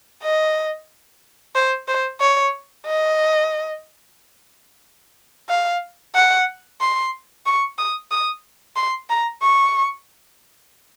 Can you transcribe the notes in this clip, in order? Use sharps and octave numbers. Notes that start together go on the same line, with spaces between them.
D#5
C5
C5
C#5
D#5
F5
F#5
C6
C#6
D#6
D#6
C6
A#5
C#6